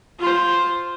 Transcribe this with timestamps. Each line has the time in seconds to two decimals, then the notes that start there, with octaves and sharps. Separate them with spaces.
0.20 F4 C5